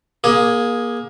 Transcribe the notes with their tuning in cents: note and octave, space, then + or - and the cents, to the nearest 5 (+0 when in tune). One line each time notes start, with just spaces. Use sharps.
A#3 +25 G#4 +0